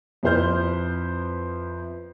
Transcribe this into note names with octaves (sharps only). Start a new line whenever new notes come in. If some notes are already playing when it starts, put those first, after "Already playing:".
F2 E4 B4 C5 F6 G6